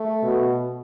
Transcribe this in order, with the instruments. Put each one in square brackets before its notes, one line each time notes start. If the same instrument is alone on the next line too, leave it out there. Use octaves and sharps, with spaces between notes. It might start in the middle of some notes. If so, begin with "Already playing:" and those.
Already playing: [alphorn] A3
[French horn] B2